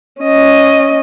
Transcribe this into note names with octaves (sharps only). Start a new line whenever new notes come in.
C#4 D#5